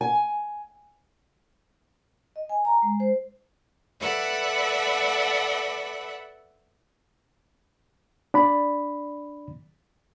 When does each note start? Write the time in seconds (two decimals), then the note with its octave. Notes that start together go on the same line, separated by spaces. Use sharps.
0.01 G#5
2.36 D#5
2.49 G#5
2.65 A#5
2.82 G#3
3.00 C5
4.00 A4 B4 D5 E5 F#5 B5
8.34 D4 D5 B5